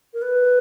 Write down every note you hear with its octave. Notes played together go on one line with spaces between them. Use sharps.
A#4
B4